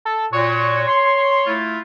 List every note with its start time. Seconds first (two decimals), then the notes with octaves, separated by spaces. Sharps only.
0.05 A4
0.33 A#2 F#4 C#5
0.87 C6
1.47 A3 E4 F4